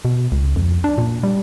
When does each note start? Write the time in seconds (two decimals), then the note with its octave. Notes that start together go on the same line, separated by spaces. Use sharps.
0.05 B2
0.32 C#2
0.56 F2
0.84 D4
0.98 A#2
1.23 G3